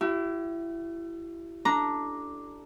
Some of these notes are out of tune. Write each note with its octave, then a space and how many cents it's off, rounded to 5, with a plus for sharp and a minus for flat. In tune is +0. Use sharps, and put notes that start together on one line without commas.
E4 +25 G4 -40
D4 +0 A4 +0 A#5 +0